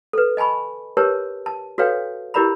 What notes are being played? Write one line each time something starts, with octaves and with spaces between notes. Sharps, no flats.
A4 B4
D#5 G#5 A5 B5 C#6
G4 A#4 B4 C#5 A5
A5
F#4 A4 B4 C#5 F5 G5
E4 G4 A#4 D5 A#5 B5